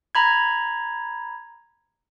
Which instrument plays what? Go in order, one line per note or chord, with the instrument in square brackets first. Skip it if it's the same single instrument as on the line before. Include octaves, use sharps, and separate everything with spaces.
[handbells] A#5 B5 G#6